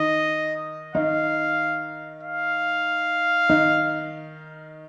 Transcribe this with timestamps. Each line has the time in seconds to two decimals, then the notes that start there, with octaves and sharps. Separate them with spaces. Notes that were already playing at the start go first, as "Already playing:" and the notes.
Already playing: D#3 D#4 D#5
0.95 D#3 D#4 F5
2.23 F5
3.49 D#3 D#4